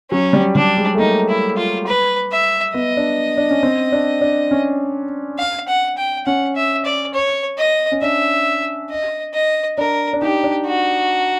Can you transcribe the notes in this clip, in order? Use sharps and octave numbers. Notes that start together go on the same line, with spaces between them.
F#3 C#4
G3
G3 D4
G#3
A3
A#3 D#4
E4
F4
B4
E5
B3 D#5
D4
D4
C#4
C4
D4
D4
C#4
F5
F#5
G5
C#4 F#5
E5
D5
C#5
D#5
C#4
D4 E5
D#5
D#5
D4 A#4
D4
D#4 G4
D4
F#4